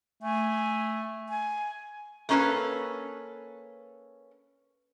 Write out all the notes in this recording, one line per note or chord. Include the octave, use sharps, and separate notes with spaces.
A3 G#5
G#5
A3 A#3 C#4 G4 A4 B4